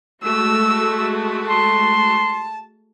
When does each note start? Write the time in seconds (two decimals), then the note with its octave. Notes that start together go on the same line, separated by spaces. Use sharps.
0.24 G#3 A3 F#4 E6
1.48 A5 C6